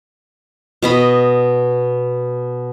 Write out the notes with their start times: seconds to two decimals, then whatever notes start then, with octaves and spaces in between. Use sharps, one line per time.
0.82 B2 D#5 B5